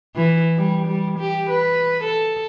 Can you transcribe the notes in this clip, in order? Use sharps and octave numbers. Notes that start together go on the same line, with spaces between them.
E3
G3
G3
G4
B4
A4